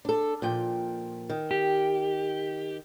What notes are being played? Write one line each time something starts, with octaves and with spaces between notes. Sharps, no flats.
D4 A4
A#2 F3 G5
D#3
G4